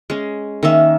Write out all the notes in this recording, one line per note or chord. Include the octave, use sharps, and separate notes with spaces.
G#3 C#4
D#3 A#3 C#4 E5